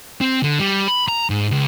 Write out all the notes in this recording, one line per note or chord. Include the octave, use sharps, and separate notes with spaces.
C4
D3
G3
B5
A#5
G#2
C#2